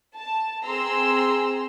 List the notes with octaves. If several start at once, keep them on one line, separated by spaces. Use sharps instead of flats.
A5
C4 G#4 A#5 C6 E6